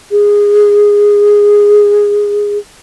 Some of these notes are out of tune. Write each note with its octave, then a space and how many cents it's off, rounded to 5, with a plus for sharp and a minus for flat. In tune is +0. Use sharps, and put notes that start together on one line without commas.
G#4 -10